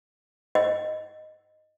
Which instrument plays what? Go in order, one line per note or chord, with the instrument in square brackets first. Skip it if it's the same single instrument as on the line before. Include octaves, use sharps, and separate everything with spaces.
[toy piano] D#5